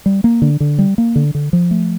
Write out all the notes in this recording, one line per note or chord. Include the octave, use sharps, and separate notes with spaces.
G3
A#3
D3
D3
G3
A#3
D3
D3
F3
A3